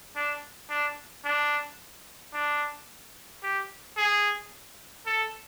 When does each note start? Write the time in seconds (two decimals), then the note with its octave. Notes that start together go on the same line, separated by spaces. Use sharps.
0.16 D4
0.70 D4
1.25 D4
2.34 D4
3.43 G4
3.97 G#4
5.06 A4